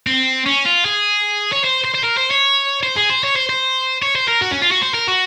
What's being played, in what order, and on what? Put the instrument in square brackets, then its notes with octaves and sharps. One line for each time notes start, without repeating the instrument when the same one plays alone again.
[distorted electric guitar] C4
C#4
F4
G#4
C#5
C5
C5
C5
A#4
C5
C#5
C5
G#4
C5
C#5
C5
C5
C#5
C5
A#4
F#4
C#4
F4
F#4
C5
A#4
F#4